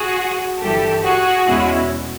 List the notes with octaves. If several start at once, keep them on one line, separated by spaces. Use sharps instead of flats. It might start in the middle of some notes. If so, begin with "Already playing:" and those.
Already playing: F#4 G#4
G1 G2 E3 G4 A4
F#4 G#4
E2 B2 G#3 C#4 E4